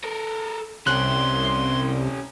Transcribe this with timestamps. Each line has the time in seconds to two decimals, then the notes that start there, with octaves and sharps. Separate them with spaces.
0.04 A4 A#4
0.87 C2 C#4 G4 C6 F#6